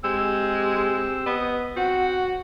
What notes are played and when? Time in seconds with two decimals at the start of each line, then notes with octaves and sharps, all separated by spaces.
0.04 G#3 C4 G4 E6
1.26 B3 D#5
1.76 C4 F#4 F#5